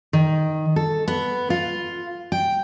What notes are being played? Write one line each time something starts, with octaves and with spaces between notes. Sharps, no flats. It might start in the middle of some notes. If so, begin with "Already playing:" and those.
D#3
A4
B3
F4
G5